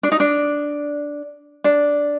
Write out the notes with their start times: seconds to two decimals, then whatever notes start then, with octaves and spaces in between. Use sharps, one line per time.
0.03 D4
0.12 D#4
0.20 D4
1.64 D4